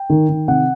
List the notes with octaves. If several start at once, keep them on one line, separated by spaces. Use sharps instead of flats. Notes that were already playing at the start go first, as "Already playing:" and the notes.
Already playing: G5
D#3
D#3
C3 F#5